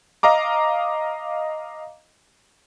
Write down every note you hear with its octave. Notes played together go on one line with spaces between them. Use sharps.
D#5 F5 A#5 D6